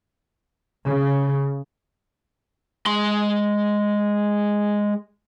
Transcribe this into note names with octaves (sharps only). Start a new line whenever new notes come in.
C#3
G#3 C6